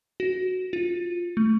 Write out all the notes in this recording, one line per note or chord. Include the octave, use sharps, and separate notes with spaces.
F#4
F4
A3